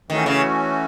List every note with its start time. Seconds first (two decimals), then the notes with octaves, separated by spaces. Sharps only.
0.09 D#3 E3 A3 C#4 F#4
0.26 C#3